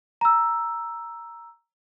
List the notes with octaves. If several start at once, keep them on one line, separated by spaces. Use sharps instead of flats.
A#5 E6